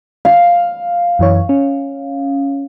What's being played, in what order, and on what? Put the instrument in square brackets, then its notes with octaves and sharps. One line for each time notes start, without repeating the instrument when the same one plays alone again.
[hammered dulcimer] F5
[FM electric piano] F#2 E3 C#5
C#4